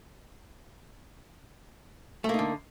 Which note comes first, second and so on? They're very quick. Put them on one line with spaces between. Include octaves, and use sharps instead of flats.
A3 A#3 D#4 D3